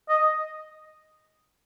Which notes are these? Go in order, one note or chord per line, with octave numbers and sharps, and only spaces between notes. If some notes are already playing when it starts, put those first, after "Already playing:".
D#5